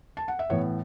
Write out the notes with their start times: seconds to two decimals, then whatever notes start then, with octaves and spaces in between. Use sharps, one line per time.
0.17 A5
0.28 F#5
0.39 E5
0.50 A2 E3 B3 C#5